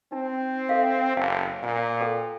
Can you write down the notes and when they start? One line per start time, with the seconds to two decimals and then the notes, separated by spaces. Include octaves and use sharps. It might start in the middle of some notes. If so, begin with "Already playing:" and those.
0.12 C4 D#4
0.69 A4 E5 F5
1.16 F#1 F5
1.63 A#2
2.01 A4 G5